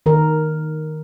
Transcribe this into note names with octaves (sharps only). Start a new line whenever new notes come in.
D#3 A#4